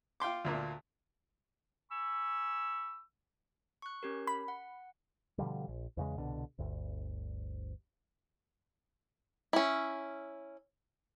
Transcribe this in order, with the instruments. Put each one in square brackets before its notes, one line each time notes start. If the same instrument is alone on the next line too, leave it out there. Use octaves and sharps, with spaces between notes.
[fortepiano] F4 G5 C6 D6
D2 A#2 A#3
[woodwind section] G#5 B5 C#6 E6
[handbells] C#6 F#6
C#4 G4 A#4
[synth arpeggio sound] B5
[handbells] F#5
[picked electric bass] B2 D3 F3 G3
A#1
E2 C#3 G#3
C2 B2 D3
G1 D2
[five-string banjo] C#4 E4